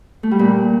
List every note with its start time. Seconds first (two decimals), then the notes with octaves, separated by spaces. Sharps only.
0.23 A3
0.31 G3
0.39 A#2